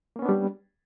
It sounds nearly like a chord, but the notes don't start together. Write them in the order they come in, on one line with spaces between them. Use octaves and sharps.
A#3 C#4 B3 D4 G3